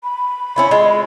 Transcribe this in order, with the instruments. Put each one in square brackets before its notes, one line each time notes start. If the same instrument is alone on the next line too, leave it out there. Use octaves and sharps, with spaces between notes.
[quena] B5
[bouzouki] C#4 E4 F4
G#3 F4